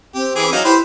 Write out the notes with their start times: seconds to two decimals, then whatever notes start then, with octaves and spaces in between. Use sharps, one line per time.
0.15 C4 G4
0.36 E3 G#4 D6
0.53 F#3 D#4 F5
0.65 E4 G4 B4 C5